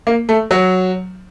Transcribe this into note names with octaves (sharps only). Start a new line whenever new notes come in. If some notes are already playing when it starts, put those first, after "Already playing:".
A#3
A3
F#3